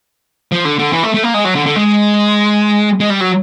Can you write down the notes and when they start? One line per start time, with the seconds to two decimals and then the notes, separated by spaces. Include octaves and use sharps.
0.52 F3
0.65 D3
0.79 D3
0.93 E3
1.03 A3
1.14 A3
1.23 A#3
1.34 G#3
1.45 F#3
1.55 D3
1.66 D3
1.76 G#3
3.00 G#3
3.10 G3
3.20 F#3